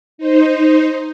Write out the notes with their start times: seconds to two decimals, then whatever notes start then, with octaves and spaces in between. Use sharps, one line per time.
0.18 D#4 C5